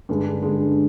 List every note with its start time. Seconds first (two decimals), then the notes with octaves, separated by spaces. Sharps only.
0.09 G2 D3 G#3
0.42 G2 D3 G#3